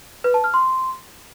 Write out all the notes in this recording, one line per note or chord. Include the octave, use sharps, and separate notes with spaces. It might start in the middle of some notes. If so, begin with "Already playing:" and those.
B4
A5
F6
C6